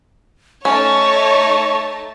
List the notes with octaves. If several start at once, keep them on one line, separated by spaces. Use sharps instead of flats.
A3 C#4 D#4 C#5 A5 C#6